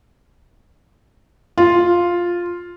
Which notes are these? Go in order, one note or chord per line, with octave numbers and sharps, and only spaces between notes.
F4